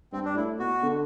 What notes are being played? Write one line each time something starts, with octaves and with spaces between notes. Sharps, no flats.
G2 C4
D4
A2 E4
B2 F#4
D3